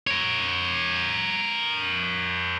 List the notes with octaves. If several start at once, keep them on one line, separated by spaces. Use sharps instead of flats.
A#4 C#5